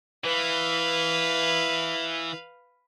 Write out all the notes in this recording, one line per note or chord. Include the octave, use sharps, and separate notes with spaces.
E3 B4 F5